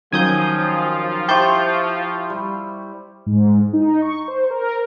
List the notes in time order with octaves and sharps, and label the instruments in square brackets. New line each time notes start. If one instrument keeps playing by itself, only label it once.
[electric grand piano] D#3 F#3 C#4 [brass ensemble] F3 F4 [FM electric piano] G#5 D#6 G6
[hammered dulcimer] E4 C5 E5 [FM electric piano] G4 A5 G6 [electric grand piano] C#6 C7
[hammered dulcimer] G3
[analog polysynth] G#2
D#4
C#6
C5
A#4